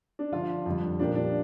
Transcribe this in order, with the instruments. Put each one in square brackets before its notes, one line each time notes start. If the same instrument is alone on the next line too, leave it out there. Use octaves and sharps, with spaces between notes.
[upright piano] D4
[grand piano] D3 F3 D4 [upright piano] F4
[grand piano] F2 D3 G3
[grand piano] A#2 F3 C4 G4 A#4 [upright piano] D4
[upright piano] D4